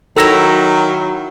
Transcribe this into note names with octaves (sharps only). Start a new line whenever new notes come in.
D#3 F#3 E4 A4 C#5 F#5 E6 A#6